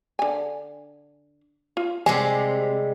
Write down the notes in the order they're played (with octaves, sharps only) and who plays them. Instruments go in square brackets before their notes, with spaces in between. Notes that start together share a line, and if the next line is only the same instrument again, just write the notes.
[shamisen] D3 G#5
F4
[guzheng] C3 G3 G#3 [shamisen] G#5